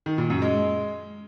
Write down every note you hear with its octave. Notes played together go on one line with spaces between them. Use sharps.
D#3
A#2
F#2
G#3